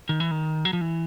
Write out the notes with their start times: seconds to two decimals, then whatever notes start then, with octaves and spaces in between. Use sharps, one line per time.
0.09 D#3
0.20 E3
0.31 D#3
0.65 F#3
0.73 F3
0.81 E3